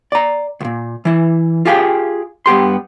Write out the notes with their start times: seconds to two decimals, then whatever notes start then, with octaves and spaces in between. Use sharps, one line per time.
0.12 D5 A#5
0.60 C#2 A#2
1.05 E3 E4
1.65 F4 G4 G#4 F5 G5
2.46 G2 B3 G4 C6